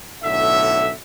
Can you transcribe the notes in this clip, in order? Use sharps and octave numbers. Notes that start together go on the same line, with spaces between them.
B1 A2 D3 E5